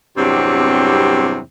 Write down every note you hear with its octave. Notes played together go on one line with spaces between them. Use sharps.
E2 G2 C3 F#3 G3 C4